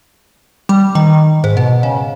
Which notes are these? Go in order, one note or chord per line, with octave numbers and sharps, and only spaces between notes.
G3
D#3
G#2
B2
C#3